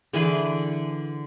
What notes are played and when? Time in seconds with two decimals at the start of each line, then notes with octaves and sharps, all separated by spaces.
0.13 D3 E3 G#4 B4